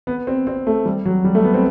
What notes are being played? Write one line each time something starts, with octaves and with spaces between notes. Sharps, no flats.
B3
C4
C4
A3
G3
F#3
G3
A3
B3
C4